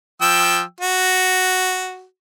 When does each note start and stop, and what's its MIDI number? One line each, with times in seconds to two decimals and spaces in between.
0.21 0.61 53
0.21 0.61 79
0.21 0.61 88
0.81 2.04 66